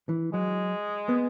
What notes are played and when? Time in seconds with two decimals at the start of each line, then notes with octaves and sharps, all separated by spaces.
0.09 E3
0.34 F#3 G#3
1.09 B3